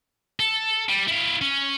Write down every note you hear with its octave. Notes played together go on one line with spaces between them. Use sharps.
A4
G3
E4 F5
C#4